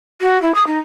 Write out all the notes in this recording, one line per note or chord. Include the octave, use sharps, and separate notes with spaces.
F#4
E4
D#6
D#4